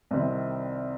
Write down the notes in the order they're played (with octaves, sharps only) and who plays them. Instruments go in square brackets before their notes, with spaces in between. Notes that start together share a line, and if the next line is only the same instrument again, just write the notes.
[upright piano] C2 C3 D#3 C4